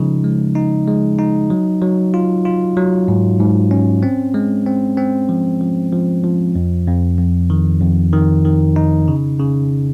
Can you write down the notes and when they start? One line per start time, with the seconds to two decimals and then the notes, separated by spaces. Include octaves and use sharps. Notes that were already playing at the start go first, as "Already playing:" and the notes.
Already playing: C#3 F3 G#3 D#4
0.24 G#3
0.55 D#4
0.87 G#3
1.19 D#4
1.50 F#3
1.82 F#3
2.14 F4
2.45 F4
2.77 F#3
3.08 G#2
3.40 G#2
3.71 C#4
4.03 C4
4.34 G#3
4.66 C4
4.97 C4
5.29 F3
5.61 F3
5.92 F3
6.24 F3
6.55 F2
6.87 F2
7.18 F2
7.50 D#3
7.81 F2
8.13 D#3
8.45 D#3
8.76 D#4
9.08 C#3
9.39 C#3